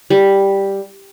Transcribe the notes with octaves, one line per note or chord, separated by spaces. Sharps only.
G3